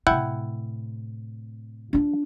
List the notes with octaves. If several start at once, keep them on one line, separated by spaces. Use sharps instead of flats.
A2 C3 E4 F#5 G5
D4 F4